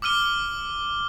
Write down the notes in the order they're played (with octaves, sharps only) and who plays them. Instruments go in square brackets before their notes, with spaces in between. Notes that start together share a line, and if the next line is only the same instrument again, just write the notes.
[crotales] D6 E6 F6 D#7 G7